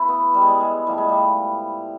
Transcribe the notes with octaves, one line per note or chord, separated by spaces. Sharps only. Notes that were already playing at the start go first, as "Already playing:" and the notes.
Already playing: B2 E4
B3
G3
G#3
G3
G#3
A2 F3 G3
G#3
G3